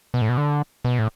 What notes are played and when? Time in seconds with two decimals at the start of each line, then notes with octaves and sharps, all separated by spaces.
0.14 B2
0.21 A2
0.29 B2
0.37 D3
0.84 B2
0.99 A2